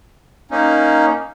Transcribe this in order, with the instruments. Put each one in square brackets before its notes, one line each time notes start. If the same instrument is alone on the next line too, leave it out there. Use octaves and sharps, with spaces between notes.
[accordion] A#3 C#4 D#4